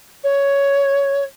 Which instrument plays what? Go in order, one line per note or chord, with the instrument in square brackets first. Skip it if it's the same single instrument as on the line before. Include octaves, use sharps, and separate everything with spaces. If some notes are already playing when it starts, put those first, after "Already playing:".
[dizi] C#5